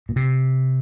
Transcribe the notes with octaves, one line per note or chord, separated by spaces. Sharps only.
A#2
C3